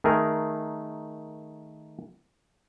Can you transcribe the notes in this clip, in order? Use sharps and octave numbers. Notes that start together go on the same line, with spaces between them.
D#3 A3 G#4 A#4